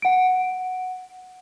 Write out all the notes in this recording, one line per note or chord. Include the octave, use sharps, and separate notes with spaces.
F#5 D7